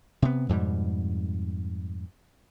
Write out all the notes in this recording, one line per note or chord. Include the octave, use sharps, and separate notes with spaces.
C3 B3
F2 G#2 B2 G3